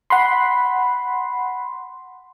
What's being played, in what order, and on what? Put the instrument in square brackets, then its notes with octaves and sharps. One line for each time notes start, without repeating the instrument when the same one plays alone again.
[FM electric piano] F#5 B5 C6